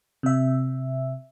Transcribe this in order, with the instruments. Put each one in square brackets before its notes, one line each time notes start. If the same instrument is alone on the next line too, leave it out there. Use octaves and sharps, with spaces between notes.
[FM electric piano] C3 E5